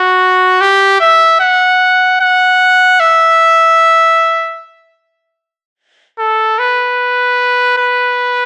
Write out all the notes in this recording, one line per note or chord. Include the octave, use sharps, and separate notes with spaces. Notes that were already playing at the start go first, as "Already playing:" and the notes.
Already playing: F#4
G4
E5
F#5
F#5
E5
A4
B4
B4